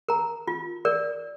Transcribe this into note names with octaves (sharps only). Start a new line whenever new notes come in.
A#4 A#5
F4
A#4 D5